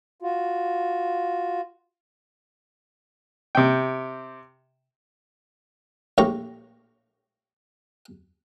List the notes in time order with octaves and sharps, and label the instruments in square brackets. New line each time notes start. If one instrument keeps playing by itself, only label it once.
[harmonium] F4 F#4
[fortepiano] C3 G5
[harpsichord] A#1 A2 G4 A#5 C#6